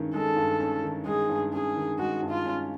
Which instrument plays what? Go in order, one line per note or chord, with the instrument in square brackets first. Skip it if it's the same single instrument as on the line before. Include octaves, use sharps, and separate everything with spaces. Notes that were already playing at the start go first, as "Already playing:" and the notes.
Already playing: [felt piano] G2 D#3 G#3 C#4
[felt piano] G#3 [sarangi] A4
[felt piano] G2
C#4
D#3
[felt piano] G#3 [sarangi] G#4
[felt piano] G2
[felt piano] C#4 [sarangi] G#4
[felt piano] D#3
[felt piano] G#3 [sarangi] F#4
[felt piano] G2
[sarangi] F4
[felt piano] C#4